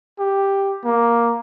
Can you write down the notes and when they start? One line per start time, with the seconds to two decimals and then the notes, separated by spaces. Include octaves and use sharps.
0.19 G4
0.84 A#3